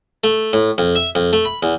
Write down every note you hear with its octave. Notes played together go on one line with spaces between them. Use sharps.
A3
A2
F2
E5
F2
A3
B5
E2